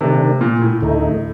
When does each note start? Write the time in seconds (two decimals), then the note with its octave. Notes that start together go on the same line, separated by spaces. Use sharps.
0.01 C3 D#3 A3 D4
0.41 A#2
0.61 A2
0.81 D2 D3 A3 D#4